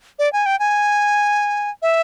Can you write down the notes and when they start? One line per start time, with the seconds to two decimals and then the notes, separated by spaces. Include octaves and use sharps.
0.19 D5
0.33 G#5
0.46 G5
0.59 G#5
1.82 E5